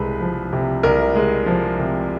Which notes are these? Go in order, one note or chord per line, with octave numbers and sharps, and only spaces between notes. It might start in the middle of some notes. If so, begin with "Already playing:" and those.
Already playing: C2 G#3 B4
F3
C3
C2 A#4
G#3
F3
C3